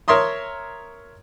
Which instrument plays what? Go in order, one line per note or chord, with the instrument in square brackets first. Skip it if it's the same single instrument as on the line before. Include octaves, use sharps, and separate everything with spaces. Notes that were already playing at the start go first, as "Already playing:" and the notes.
[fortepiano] A#4 C#5 E5 C6 D#6